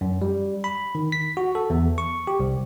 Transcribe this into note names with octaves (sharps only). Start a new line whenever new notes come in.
F#2
G3
B5
D#3
B6
F#4
A4
E2
C#6
G4
C2